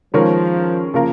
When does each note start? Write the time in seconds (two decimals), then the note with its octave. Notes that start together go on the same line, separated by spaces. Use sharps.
0.14 D#3 F3 G#3 C#4 A#4
0.94 C#3 F3 A#3 F4 A#4